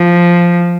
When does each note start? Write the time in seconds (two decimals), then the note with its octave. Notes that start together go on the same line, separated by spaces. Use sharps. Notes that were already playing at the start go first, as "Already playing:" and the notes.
Already playing: F3